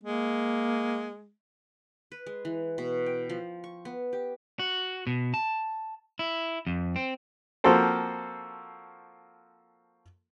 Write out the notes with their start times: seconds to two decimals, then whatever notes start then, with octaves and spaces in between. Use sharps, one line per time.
0.04 G#3 A#3
2.12 B4
2.26 G#3
2.45 E3
2.78 B2
3.06 G5
3.30 F3
3.64 C#6
3.85 B3
4.13 G4
4.59 F#4
5.07 B2
5.34 A5
6.19 E4
6.67 F2
6.96 C4
7.64 F3 A#3 C4 F#4 A4 C5